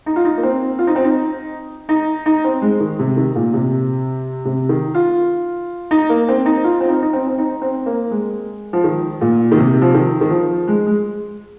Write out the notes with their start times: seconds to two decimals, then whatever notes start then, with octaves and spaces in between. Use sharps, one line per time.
0.06 D#4
0.16 F4
0.25 D#4
0.38 A#3
0.43 C4
0.79 F4
0.87 D#4
0.96 C4
1.04 D#4
1.89 D#4
2.26 D#4
2.44 C4
2.62 G#3
2.80 D#3
2.99 C3
3.17 D#3
3.35 A#2
3.53 C3
4.45 C3
4.69 D#3
4.94 F4
5.91 D#4
6.09 A#3
6.29 C4
6.46 D#4
6.64 F4
6.81 C4
6.89 D#4
7.02 D#4
7.13 C4
7.28 C4
7.38 D#4
7.62 C4
7.86 A#3
8.11 G#3
8.73 F3
8.84 D#3
9.21 A#2
9.52 D#3
9.57 C3
9.82 F3
9.94 D#3
10.21 D#3
10.30 F3
10.68 G#3
10.87 G#3